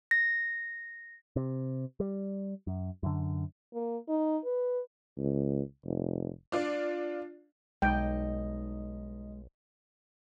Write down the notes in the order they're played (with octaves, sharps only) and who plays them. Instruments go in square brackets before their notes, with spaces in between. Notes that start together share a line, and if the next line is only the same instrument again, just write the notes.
[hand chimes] A#6
[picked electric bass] C3
G3
F#2
F#2 D3
[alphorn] A#3
D#4
B4
[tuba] C#2
F1
[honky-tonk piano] D4 F4 D5
[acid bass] B1 [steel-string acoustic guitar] G2 D#4 D#5 [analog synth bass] G#3 [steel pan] G5